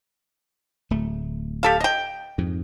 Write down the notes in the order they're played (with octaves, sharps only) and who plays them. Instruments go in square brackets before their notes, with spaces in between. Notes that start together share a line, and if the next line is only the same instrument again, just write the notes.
[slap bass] D1 A3
[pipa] G4 A4 F5
D#5 G5
[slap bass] F2 G#2